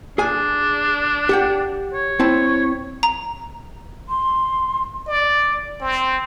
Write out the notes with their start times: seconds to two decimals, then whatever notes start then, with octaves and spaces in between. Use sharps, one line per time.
0.18 D4 G#4 G#5
1.29 G4 F#5 G5
1.93 C#5
2.20 C4 E4 A5
3.03 A#5
4.09 C6
5.07 D5
5.81 C4